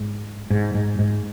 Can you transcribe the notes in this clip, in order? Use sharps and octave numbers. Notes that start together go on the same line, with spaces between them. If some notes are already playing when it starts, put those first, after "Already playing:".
Already playing: G#2
G#2
G#2
G#2